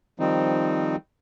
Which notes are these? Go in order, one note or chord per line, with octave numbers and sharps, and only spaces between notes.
D#3 F3 G3 C4 D#4